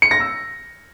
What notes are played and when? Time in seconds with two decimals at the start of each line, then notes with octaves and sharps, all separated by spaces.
0.02 C#7
0.11 A#6
0.20 E6